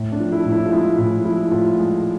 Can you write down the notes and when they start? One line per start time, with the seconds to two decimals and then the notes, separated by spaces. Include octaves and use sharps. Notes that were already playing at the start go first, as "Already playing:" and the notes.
Already playing: A2
0.12 D4
0.19 F3
0.32 E4
0.45 A2
0.52 E4
0.66 F4
0.72 G#3 E4
0.98 A2 E4
1.25 F3 E4
1.51 A2 F4
1.78 G#3